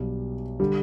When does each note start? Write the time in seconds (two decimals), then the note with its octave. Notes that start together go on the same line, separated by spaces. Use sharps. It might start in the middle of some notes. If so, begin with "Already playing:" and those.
Already playing: B1 B2 G3
0.60 D3 G3